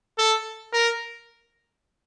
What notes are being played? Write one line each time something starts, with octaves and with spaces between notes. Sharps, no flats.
A4
A#4